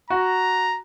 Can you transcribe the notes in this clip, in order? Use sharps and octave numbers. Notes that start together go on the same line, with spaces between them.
F#4 A#5